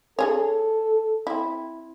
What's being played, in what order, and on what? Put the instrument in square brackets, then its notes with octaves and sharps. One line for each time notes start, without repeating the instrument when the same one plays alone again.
[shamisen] D4 G#4 C#5 [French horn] A4
[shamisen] C4 E4